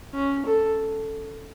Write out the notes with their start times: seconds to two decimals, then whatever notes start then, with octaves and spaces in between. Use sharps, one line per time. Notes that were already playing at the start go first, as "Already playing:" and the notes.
0.14 C#4
0.46 A4